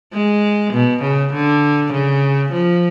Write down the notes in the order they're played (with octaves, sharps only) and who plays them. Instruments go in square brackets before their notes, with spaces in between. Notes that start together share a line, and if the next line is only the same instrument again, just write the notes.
[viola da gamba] G#3
B2
C#3
D3
C#3
F3